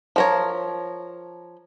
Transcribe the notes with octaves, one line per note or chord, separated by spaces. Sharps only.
F3 A#4 C#5